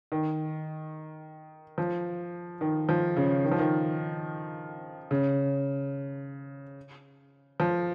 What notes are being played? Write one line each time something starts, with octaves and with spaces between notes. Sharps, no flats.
D#3
F3
D#3
F3
C#3
D#3
F3
D#3
C#3
F3